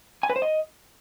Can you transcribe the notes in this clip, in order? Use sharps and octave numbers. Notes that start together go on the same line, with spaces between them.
G#5
B4
C5
D#5